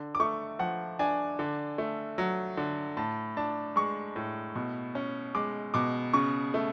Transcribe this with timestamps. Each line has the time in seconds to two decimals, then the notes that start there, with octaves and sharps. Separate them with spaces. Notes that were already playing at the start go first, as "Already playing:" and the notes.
Already playing: D3
0.15 D6
0.20 A3 C#6
0.59 F3 F#5
0.99 D4 G#5
1.39 D3
1.78 A3
2.18 F#3
2.57 D3
2.97 A2 A5
3.37 D4 A5
3.76 G#3 C#6
4.16 A2
4.55 B2
4.95 C#4
5.35 G#3 D6
5.74 B2 D6
6.13 C#3 C#6
6.54 A3